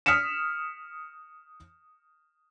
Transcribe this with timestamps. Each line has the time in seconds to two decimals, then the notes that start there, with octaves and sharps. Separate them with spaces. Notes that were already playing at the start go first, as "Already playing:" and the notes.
0.06 D#6 F6 B6 C#7 E7